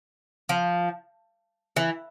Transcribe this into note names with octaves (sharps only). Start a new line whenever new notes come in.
F3
E3